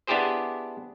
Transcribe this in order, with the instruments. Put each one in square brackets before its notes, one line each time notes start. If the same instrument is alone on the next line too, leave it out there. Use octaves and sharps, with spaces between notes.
[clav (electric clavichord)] B3 D4 E4 G4 G#4 C5